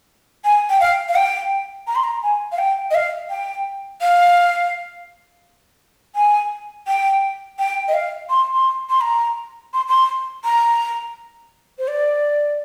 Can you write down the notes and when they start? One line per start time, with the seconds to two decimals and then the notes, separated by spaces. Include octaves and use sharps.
0.45 G#5
0.70 G5
0.80 F5
1.08 F5
1.16 G5
1.87 A#5
1.95 C6
2.04 A#5
2.23 G#5
2.52 F5
2.58 G5
2.91 D#5
2.95 F5
3.30 G5
4.02 F5
6.16 G#5
6.87 G5
7.59 G5
7.88 D#5
7.94 F5
8.30 C6
8.54 C6
8.90 C6
9.01 A#5
9.74 C6
9.88 C6
10.45 A#5
11.79 C5
11.88 D5